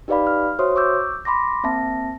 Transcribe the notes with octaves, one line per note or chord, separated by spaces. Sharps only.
D#4 G4 B4 D5 F5 B5
F6
F#4 C5 C#5 E5 C6 D#6
C#6 D6 E6 G6
B5 C6 D6 A#6
A#3 C4 E5 A5 A#6